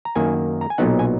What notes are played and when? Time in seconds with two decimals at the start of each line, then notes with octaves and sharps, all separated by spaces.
0.05 A#5
0.15 F#2 D#3 A#3 G#5
0.61 A#5
0.70 G#5
0.78 B1 A#2 F#3 B3 D#4 F#5
0.99 G#5